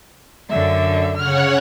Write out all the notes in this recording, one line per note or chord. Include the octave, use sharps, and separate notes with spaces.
F#2 D3 E5
C#3 C#5 F#5 F6